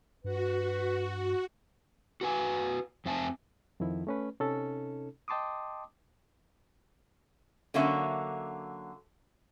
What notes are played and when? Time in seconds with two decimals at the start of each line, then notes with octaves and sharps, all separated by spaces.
0.24 G2 F#4 B4
2.21 F#4 B4 G#5
3.05 F2 C4 E5 G#5 A5
3.80 F2 D#3 F3 E4
4.07 A3 C#4 B4
4.40 C3 C#4 D#4 A4
5.28 D#5 G5 A5 C6 D6 D#6
7.74 D3 F#3 A#3 C#4 E5